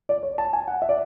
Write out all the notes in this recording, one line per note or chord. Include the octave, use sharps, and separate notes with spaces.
D5
C#5
A5
G#5
F#5
E5
D5